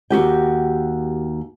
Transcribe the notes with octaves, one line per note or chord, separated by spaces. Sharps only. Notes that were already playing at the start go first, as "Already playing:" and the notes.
D#2 F#4 G4 G5